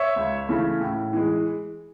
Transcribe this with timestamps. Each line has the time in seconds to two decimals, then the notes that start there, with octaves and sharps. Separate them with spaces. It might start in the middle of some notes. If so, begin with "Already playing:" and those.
Already playing: C#5 E5
0.16 C#2
0.49 C#3 E3 A3 C#4
0.80 A2
1.13 E3 G#3